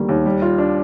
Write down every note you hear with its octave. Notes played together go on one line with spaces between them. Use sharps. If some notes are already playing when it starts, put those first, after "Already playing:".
Already playing: D2 D#3 G3 A#3
D#2
G3
F4
D4